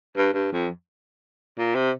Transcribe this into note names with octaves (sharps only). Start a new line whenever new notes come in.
G2
G2
F2
A#2
C3